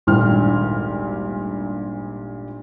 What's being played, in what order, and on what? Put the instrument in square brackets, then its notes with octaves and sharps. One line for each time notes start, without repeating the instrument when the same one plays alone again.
[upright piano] G#1 D2 G2 A#2 G5 F6